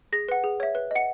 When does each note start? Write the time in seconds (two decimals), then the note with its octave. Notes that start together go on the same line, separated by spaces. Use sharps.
0.13 G#4 A#6
0.29 B4 F#5
0.44 G#4
0.60 C#5 E5
0.75 B4
0.91 D#5 F#5 C#7